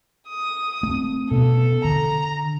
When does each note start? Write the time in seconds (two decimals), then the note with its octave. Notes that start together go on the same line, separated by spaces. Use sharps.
0.29 D#6
0.83 A3 C4
1.31 B2 B3 C#4 A4
1.85 D3 A#5